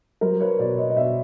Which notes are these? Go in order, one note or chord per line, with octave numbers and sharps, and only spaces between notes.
F#3 A#4 C5
B4 C#5
B2 C5 D5
C#5 D#5
D#5
B2 D5 E5